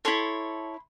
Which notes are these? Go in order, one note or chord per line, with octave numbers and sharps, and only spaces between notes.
E4 A4 C#5 C6